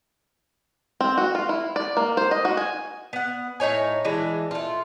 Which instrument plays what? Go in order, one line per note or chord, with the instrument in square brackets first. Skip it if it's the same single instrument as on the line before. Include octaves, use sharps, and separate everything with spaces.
[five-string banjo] C4
F#4
F4
E4
D5
A#3
C5
D#5
F#4
G#5
[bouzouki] B3 F#5
A2 D#4 C#5 G#5
E3 G#3 D4
A3 F4